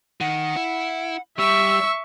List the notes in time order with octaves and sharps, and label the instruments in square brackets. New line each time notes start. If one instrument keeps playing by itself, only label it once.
[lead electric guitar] D#3 [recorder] F#5
[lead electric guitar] E4
[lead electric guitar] G3 [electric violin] E5 C#6 [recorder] E6